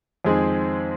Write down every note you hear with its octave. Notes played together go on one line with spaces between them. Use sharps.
F2 D#3 G#3 C4 G#4